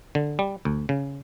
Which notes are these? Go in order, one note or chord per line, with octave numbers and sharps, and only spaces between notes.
D3
G3
D2
C#3